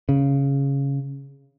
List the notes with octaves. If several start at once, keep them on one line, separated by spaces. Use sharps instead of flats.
C#3